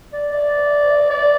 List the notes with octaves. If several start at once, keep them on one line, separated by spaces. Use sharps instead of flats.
D5
D5
D5